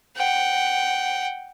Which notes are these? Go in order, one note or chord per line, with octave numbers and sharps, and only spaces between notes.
F#5 G5